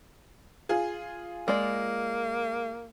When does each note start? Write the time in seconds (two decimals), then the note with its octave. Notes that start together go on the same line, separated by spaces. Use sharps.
0.69 F4 G#4
1.48 G#3 A#3 D5